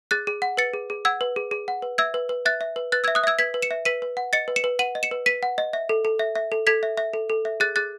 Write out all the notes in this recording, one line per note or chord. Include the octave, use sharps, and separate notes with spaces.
G#4 F#6 A6
G#4
F#5
B4 A6 C#7
G#4
G#4
F#5 E6 G#6
B4
G#4
G#4
F#5
B4
E5 E6 G#6
B4
B4
E5 F#6 A6
E5
B4
B4 F#6 A6
E5 E6 G#6
D#6 F#6
E5 E6 G#6
B4 G#6 B6
B4
C#7 E7
E5
B4 B6 D#7
B4
F#5
D#5 A6 C#7
B4
C#7 E7
B4
F#5 D#7 F#7
D#5
C#7 E7
B4
B4 B6 D#7
F#5
D#5
E5
A4
A4
E5
E5
A4
A4 G#6 B6
E5
E5
A4
A4
E5
G#4 F#6 A6
G#4 F#6 A6